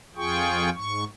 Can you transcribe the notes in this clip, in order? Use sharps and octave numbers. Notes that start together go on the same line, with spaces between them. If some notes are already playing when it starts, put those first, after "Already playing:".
F2 F4 G#4 G5 C#6
G#2 C#6